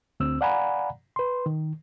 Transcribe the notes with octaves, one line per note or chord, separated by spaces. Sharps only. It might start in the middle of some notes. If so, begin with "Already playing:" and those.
D2 C4 E6
D5 F5 F#5 G#5 A#5 B5
B4 C6
D#3